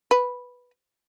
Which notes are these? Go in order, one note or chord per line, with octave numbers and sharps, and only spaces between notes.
B4